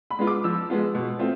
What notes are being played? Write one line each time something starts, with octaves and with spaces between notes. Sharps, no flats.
B5
G#3 B3 F4
D6
F3 E6
G#3 B3 F4
B2
A3 C4 F4